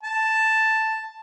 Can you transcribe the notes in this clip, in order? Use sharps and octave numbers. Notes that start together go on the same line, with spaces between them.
A5